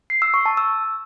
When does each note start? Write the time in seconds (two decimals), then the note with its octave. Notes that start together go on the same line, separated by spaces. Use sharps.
0.10 C7
0.22 E6
0.34 C#6
0.46 A5
0.57 E6